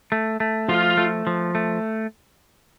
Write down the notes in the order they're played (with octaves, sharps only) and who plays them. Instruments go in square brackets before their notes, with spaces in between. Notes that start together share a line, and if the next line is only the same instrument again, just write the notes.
[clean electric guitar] A3
A3
[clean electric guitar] F3 [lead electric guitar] F4
[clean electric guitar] A3
F3
A3